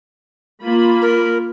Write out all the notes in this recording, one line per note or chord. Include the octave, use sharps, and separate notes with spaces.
A#3 F4 B5
A#4